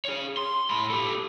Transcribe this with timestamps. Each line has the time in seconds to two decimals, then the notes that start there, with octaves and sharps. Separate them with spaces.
0.05 G#4 C#5
0.37 C6
0.70 A2 B5
0.90 G4 A4